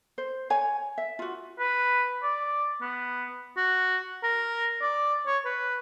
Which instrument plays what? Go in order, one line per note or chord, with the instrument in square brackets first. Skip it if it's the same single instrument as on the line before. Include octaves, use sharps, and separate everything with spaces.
[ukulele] C5
C#5 G#5
E5
F4 F#4
[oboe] B4
D5
B3
[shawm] F#4
A#4
D5
C#5
B4